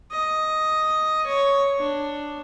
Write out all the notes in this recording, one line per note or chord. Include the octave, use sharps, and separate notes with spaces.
D#5
C#5
D4